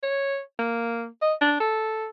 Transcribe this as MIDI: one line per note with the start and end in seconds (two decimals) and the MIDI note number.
0.03 0.40 73
0.59 1.06 58
1.22 1.34 75
1.41 1.58 62
1.60 2.07 69